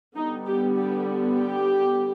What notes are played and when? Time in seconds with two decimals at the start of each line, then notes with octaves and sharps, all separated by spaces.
0.16 D3 G3 B3 D#4
0.47 G4
0.77 G4
1.38 G4